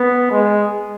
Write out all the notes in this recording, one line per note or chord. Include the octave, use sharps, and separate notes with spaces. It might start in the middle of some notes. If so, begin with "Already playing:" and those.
Already playing: B3
G#3